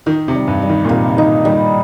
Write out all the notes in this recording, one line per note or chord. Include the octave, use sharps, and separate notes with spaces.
D#3 D#4
C3
G3
G2
G3
D#3
A#2
C3 A#3
C3
D#3 D#4
D#3 G3